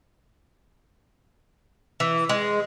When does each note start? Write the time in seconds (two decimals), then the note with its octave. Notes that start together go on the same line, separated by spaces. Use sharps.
2.00 E3
2.29 G#3